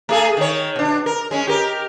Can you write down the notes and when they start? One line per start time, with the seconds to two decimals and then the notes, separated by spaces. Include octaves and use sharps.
0.09 A3 G#4 A4
0.37 D#3 C#5
0.76 B2 D4
1.06 A#4
1.31 G#3 C#4
1.47 G4 A#4